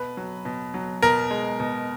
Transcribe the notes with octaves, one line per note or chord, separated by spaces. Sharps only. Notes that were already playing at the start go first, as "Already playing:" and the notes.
Already playing: B2 B4
F#3
B2
F#3
B2 A#4
G#3
B2